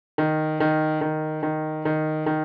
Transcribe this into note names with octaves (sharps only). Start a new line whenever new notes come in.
D#3
D#3
D#3
D#3
D#3
D#3